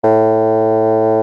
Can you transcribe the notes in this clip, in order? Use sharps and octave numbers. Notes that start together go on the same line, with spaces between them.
A2